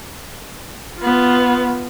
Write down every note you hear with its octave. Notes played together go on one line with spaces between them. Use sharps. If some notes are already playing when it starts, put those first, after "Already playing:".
B3 F4